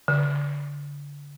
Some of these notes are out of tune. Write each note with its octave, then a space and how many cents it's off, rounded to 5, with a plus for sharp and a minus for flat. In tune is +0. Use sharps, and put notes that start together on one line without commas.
D3 -35